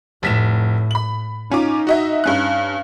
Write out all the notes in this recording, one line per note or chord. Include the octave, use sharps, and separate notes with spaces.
F1 A2 B6 E7
B5 F#7
C#4 D#4 F4 D6
F#4 D#5 E5
G2 C#4 F#6